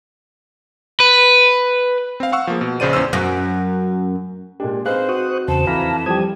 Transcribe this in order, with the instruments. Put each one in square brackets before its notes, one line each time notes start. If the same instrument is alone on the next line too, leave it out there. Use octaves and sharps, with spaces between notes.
[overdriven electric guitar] B4
[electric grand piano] C4 F5
F5 F#5 C#6 E6
F3 A#3 G#4
B2
A#1 C#3 C5 D5 D#7
E2 C#4 C5 E6
[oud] F#2
[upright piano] A#2 G#3 D4 [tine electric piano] G4
[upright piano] C4 D#4 B4 [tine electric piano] G#4 F5 F#6 [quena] C5
[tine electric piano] F#4 [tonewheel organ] C#6 D#6 F#6
[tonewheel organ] E2 C#3 C5 [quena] A5
[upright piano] F2 E3 [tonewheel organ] F5 A#5 B5
[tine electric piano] F3 G3 G4 [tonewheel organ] D#6 G#6